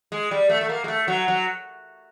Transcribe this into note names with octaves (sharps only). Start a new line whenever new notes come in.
G#3
G3
A3
A3
A#3
G#3
A3
F#3
F#3